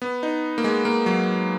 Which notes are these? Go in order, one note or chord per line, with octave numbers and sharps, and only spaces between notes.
B3
D#4
A#3
G#3
A#3
F#3